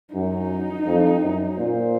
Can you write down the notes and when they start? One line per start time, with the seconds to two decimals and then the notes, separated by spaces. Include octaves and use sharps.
0.14 F#2 D#4
0.86 F2
1.22 F#2
1.58 A#2 C5